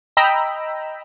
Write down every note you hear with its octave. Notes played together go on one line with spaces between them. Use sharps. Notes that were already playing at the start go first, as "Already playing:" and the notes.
D#5 G5 A#5 B5 E6